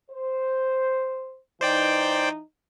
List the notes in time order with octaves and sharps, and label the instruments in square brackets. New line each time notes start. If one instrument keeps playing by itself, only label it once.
[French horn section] C5
[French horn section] E3 D#4 [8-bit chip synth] C5 D5 G5